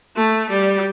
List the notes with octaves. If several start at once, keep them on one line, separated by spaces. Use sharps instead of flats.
A3
G3